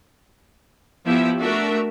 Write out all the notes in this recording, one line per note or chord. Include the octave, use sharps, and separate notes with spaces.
F3 B3 E4 G4 E5
A3 D4 F#4 A#4 E5